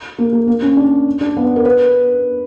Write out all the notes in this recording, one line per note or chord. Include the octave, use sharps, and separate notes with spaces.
A#3
A#3
A#3
C#4
D4
D4
B3
A#4
B4